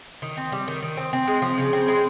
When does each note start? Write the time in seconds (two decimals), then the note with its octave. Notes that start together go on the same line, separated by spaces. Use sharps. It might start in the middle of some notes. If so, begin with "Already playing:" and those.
0.22 D#3
0.37 C4
0.52 G3
0.68 D#3
0.83 D#3
0.97 C4
1.13 C4
1.28 G#3
1.42 F3
1.58 C#3
1.73 C4
1.88 G#3